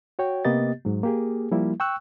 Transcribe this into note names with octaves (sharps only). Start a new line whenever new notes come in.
F#4 C#5 G5
C3 A#3 B3 G4 D#5 A6
G#2 F#3
A#3 G4 G#4
F3 G3 A#3 E4
G5 C#6 E6 F#6